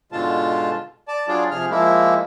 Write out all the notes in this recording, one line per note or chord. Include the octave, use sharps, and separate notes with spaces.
G#2 B2 D3 G#3 F4 A5
D5 A5
F#3 D4 F4 G#4 D5
C3 F3 G#4 F6
F3 G#3 A#3 E4